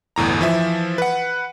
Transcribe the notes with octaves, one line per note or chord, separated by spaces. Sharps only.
G1 E2 A2 A#5
E3 F3 E5
B4 F#5